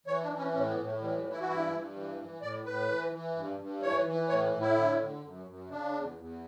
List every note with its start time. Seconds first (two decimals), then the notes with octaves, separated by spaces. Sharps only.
0.07 E3 C#5
0.23 D4
0.31 E3
0.38 C#4
0.54 A2 C#4
0.70 B3
0.77 A2
0.86 A3
1.01 E3 G3
1.17 G3
1.24 E3
1.32 E4
1.40 F#4
1.47 G2 E4
1.71 G2
1.95 E3
2.18 E3
2.41 A2 D5
2.65 A2 B4
2.88 E3
3.12 E3
3.36 G2
3.59 G2
3.82 E3 C#5
4.06 E3
4.29 A2 C#5
4.53 A2
4.61 E4
4.76 D3
4.99 D3
5.24 F#2
5.47 F#2
5.70 C#3 D4
5.95 E2
6.18 E2